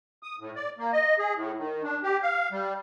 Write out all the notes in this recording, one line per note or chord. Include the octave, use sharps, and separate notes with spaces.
D#6
A2
D5
A#3
D#5
G#4
A2
D#3
D4
G4
F5
G3